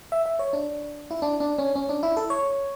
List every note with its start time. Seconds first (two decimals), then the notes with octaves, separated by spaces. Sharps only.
0.12 E5
0.26 E5
0.39 C#5
0.53 D4
1.11 E4
1.22 D4
1.40 D4
1.58 C#4
1.75 C#4
1.89 D4
2.03 E4
2.17 A4
2.30 C#5